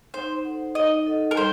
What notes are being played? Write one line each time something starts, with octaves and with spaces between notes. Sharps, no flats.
D#4 C5
A4 C5 F#5
D#4 D#5
A4 D#5 F#5
A#4
G3 C5